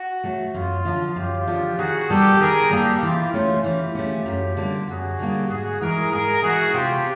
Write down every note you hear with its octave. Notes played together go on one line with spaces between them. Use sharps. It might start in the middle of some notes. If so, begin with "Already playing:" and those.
Already playing: F#4
F#3 A3
F#2 F4
D3 F3
F#2 F4 G4
D3 F3
D#3 F#4 G#4
G3 A#3 G4 A4
D#3 G#4 A#4
G3 A#3 G4 A4
E3 F4 G4
A3 C#4 F4
E3 F4 G4
A3 C#4
F#2
D3 G3 A#3
F#2 F#4 G#4
D3 G3 A#3
G#2 F#4 G#4
E3 G#3 G#4 A#4
G#2 G#4 A#4
E3 G#3 F#4 G#4
C3 F4 G4